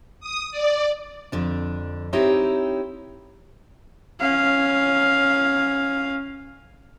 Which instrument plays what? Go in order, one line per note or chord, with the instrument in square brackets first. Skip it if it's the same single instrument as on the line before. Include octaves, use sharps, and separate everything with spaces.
[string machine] D#6
D5
[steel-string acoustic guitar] F2 D3 D4
C4 D#4 E4 G4 C#5
[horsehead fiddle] C#4 F5